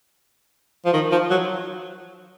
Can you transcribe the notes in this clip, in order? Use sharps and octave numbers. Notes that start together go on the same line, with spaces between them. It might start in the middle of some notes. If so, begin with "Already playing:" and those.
F3
D#3
F3
F#3